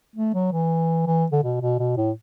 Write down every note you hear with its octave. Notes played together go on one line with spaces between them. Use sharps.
A3
F#3
E3
E3
D3
B2
B2
B2
A2